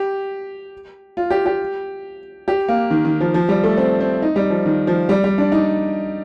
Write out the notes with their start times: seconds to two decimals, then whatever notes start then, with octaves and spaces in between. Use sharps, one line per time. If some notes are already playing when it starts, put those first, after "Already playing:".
Already playing: G4
1.17 F4
1.30 G4
1.46 G4
2.48 G4
2.68 A#3
2.90 D#3
3.05 D#3
3.20 F3
3.34 F3
3.49 G3
3.64 A3
3.78 C4
4.00 C4
4.22 D#4
4.36 G3
4.50 F3
4.65 D#3
4.87 F3
5.09 G3
5.24 G3
5.38 D4
5.52 D#4